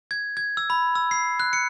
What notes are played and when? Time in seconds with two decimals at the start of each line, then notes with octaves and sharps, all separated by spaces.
0.11 G#6
0.37 G#6
0.57 E6
0.70 B5
0.95 E6
1.11 C7
1.40 F#6
1.53 C#7